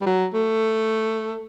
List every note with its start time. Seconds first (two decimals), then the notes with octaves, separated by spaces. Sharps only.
0.01 G3
0.06 F#3
0.34 A3